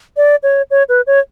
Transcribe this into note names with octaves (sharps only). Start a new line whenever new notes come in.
D5
C#5
C#5
B4
C#5